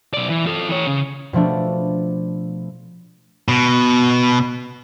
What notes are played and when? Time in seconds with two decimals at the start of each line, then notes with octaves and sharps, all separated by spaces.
0.14 B1 D5
0.29 E3
0.46 F4 A4
0.69 E3 C#5
0.87 C#3
1.33 B2 F3 A3 D4
3.48 B2